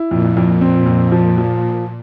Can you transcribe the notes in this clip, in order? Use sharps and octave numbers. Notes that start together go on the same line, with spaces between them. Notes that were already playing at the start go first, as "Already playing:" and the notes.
Already playing: E4
F2 A#2
F2
A#2 C4
F2
F3
F3